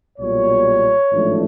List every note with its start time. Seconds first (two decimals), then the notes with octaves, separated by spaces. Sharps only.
0.18 B1 A#2 G3 C#5
1.11 A1 G#2 F3 A3 D4